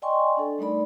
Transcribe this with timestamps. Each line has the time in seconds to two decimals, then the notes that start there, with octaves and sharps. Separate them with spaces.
0.02 D5 D#5 G5 G#5 C6 C#6
0.37 D4 A4
0.58 G3 A3 D#4 A#4 D5 B5